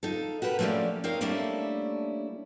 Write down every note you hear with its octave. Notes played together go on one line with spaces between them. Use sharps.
D#4 F4 A4
F#4 G4 A#4 B4
F3 A3 A#3 C#4 G4 D5
C4 D#4 A#4 C#5 F5
G3 A3 A#3 C#4 D4 E4